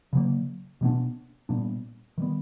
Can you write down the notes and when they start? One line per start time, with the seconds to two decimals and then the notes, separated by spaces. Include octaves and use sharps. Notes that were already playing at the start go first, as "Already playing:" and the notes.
0.13 C#3 F#3 A#3
0.81 B2 G3 B3 D4
1.49 A#2 G3 B3 D4
2.18 D#3 G3 B3